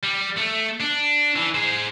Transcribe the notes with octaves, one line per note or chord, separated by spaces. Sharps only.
G3
A3
D4
E3
G#4 C5